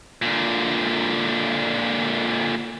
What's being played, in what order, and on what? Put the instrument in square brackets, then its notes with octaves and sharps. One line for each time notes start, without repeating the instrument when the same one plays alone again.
[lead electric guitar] A#2 D3